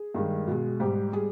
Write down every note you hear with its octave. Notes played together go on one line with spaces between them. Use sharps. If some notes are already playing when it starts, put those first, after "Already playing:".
Already playing: G#4
G2 D#3 G#3
B2 G#3
G#2 G3 G4
G3 G#4